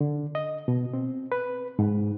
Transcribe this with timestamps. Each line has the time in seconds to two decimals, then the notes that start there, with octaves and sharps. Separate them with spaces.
0.01 D3
0.35 D#5
0.68 B2
0.94 C4
1.32 B4
1.79 G#2